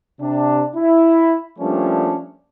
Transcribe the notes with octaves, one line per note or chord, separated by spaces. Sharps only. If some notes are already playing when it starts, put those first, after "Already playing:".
C3 D4
E4
F3 G3 A3 A#3 C#4 D4